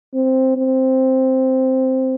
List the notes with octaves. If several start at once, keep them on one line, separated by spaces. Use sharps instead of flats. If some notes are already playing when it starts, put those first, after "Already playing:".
C4
C4